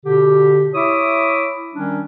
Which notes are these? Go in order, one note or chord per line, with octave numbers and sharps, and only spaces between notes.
B2 D3 G4
E4 C#5 E5 D6 D#6
D#3 G3 C#4 D4